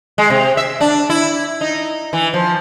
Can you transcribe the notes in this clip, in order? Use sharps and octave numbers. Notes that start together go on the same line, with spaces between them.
G#3
C3
E5
D4
E4
D#4
E3
F3